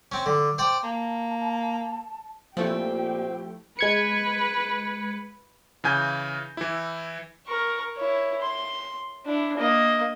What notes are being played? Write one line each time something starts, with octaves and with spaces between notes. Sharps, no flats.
C4 C#4
D3
C5 D5 G5
A#3 A5
A#2 F3 A3 C4 E4 G4 G5
G#3 B4 G#6 C#7
C#3 E3 G#5 G6
E3 E4
A#4 C#6
E4 C#5
C6
D4 E4
A#3 D#5